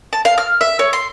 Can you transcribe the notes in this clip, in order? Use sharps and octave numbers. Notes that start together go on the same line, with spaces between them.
A5
F5
F6
E5
C#5
C6